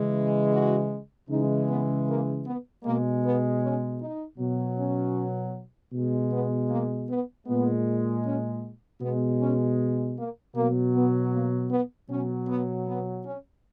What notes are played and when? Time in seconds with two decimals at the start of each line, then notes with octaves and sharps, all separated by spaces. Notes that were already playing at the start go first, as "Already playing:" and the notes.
Already playing: C#3 E3 G#3
0.52 F#4
1.29 C#3 E3 G#3 D#4
1.68 B3
2.07 A#3
2.44 B3
2.83 B2 G#3 A#3
3.23 B3
3.61 C#4
3.99 D#4
4.38 B2 F#3
4.76 C#4
5.92 B2 G#3
6.31 B3
6.68 A#3
7.08 B3
7.47 A#2 G#3 B3
8.24 C#4
9.00 B2 G#3 B3
9.40 C#4
10.16 A#3
10.54 B2 F#3 A#3
10.93 B3
11.32 A#3
11.70 B3
12.08 B2 F#3 C#4
12.47 B3
12.86 B3
13.24 C#4